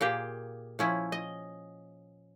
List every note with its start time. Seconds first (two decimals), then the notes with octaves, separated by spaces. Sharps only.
0.01 A#2 A#3 G4 G#4
0.79 F3 C#4 E4
1.12 D#5